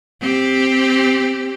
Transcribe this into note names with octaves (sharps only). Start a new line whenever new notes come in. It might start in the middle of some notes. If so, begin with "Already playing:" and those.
C4 G4